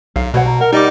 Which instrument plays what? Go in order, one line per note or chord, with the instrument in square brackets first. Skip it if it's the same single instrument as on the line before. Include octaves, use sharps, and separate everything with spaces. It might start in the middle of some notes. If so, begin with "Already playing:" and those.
[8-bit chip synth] B1 [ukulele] F5
[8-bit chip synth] B2 [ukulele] B4 C#5 F#5
[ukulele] A#5
[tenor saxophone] A#4 [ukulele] F#5
[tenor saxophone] G3 [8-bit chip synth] D#4 D#5 D6 [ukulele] G5